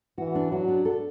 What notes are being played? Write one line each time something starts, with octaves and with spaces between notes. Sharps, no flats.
E3 F#4
D4
F#3 F#4
D4
A4